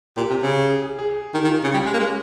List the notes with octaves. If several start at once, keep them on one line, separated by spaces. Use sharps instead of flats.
A#2 G4
C3
C#3
G#4
G#4
G#4
G#4
D#3 G4
D#3
F4
C#3 F4
G3 G4
G#3 C#4
A#3
G#3 C#4